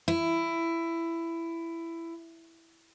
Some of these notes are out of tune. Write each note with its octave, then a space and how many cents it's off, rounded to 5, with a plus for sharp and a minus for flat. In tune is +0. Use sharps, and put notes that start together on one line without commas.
E4 +15